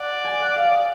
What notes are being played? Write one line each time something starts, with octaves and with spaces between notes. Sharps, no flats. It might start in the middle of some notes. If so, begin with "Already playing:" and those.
Already playing: D5 F#5
G#5
F#5
F5
D#5